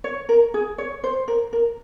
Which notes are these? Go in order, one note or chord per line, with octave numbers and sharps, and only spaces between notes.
C#5
A#4
G#4
C#5
C5
A#4
A#4